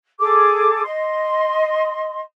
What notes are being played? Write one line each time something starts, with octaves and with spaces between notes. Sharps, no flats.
G#4 A4 D6
D#5 C6